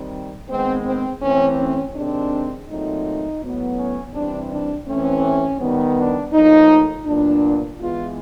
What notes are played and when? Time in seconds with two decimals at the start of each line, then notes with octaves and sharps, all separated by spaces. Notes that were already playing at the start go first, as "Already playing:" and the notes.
Already playing: D#3 G3 C4
0.49 D#3 G#3 B3 C4
0.84 C4
1.22 E3 A3 C4 C#4
1.58 C#4
1.94 C3 D#3 G#3 C4 D4
2.67 A#2 F#3 A3 C4 D#4
3.41 A2 F#3 B3
3.77 C#4
4.14 C3 E3 G3 C4 D4
4.50 D4
4.87 E3 A3 C4 C#4
5.60 D#3 G3 B3
5.96 D4
6.32 A2 F3 A#3 D#4
7.05 A#2 F#3 B3 D4
7.79 E3 G#3 B3 F4